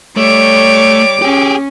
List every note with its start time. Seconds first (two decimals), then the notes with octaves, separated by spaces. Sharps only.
0.17 G3 A3 C#5 D6
1.22 C#4 G4 G#4